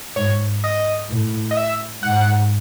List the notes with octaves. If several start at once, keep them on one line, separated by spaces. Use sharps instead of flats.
G#2 C#5
D#5
A2
D#5
E5
G#2 F#5